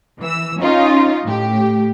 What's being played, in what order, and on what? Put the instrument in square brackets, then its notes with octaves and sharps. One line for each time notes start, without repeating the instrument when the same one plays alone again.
[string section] E3 E6
C#4 D#4 F4 D#5
A2 G4